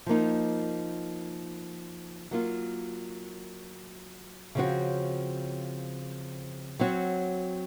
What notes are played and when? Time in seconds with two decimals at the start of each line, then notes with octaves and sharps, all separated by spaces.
0.06 F3 A#3 D#4
2.31 F#3 A#3 F4
4.55 C#3 F3 C4 F#4 C#5
6.79 F#3 C4 F#4 C#5